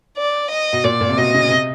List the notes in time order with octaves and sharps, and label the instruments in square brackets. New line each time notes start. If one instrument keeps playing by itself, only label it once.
[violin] D5
D#5
[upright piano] B2
[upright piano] A#2 [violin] D5
[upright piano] A#2
C3
[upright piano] B2 [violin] D#5
[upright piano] C#3
C3